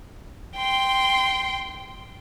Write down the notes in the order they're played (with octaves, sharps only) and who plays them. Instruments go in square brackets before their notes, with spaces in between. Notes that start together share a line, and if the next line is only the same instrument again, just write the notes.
[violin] G5 C6